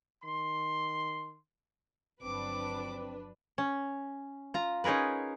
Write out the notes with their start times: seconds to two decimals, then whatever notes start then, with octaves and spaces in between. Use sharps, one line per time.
0.23 D#3 C6
2.22 G1 F3 F#3 C4 D4 B4 D6
3.58 C#4
4.54 F4 A#5
4.84 C#4 D#4 G#4 A#4 B4